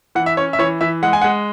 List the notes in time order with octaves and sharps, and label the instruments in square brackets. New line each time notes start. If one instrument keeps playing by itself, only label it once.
[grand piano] E3 F#5
E5
C#4 C#5
E5
E3 C#5
E3 E5
G#3 F#5
G#5
F#5
G#3